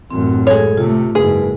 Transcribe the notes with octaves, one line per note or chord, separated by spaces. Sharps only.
A1 F#2 C4
G#3 G#4 A4 C#5
C3 A3 F4
F#1 G#2 G#4 B4